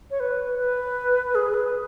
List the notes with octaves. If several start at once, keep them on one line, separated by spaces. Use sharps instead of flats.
C#5
B4
B4
G#4
B4